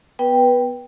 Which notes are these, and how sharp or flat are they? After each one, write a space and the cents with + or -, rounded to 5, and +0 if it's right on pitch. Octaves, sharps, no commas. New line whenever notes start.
B3 +10 B4 -15 G5 +0